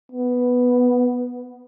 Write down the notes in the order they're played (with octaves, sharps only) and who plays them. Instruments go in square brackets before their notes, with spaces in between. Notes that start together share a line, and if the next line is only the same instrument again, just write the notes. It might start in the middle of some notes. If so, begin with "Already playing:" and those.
[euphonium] B3